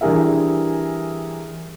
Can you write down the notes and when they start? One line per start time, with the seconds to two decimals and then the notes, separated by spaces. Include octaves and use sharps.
0.01 E3 G3 D4 G#4 A#4 E5